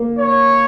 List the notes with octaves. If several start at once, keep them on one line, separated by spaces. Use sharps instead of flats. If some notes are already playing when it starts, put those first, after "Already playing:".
Already playing: A#3
C#5